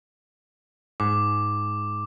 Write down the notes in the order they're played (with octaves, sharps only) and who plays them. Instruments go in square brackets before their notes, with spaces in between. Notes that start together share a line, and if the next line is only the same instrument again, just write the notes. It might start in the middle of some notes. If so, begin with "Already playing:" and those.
[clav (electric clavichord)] G#2 [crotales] D6